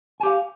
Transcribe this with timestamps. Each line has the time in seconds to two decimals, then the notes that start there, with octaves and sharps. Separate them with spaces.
0.20 G#5
0.23 G4
0.27 F5